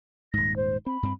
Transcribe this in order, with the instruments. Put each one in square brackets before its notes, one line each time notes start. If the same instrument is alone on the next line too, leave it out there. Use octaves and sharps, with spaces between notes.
[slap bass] D#1 G#2 [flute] A#6
[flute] C5
[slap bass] C4 [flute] B5
[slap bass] G2 C4